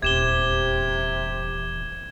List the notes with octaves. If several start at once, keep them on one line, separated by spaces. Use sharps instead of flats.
D#1 E2 C3 G4 G#6 E7 G7